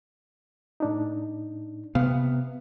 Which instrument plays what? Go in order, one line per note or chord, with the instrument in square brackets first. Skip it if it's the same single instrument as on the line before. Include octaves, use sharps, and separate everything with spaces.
[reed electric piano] A2 D4 D#4
[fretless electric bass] C3 B3 [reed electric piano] F5